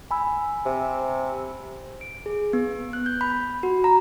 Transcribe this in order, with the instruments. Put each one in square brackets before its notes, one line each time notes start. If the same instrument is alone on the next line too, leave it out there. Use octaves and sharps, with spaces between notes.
[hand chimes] G#5 B5 E6
[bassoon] C3
[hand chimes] D7
G#4
B3
F#6
G6
B5
F#4
A#5